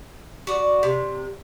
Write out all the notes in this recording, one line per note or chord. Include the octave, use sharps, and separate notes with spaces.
F#4 D5
C3